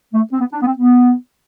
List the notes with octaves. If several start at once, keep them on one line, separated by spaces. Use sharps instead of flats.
A3
C4
B3
D4
B3
C4
B3